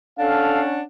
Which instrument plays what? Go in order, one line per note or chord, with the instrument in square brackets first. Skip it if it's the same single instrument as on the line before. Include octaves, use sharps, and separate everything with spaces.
[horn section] C#4 D4 F#5 [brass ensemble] A4 F5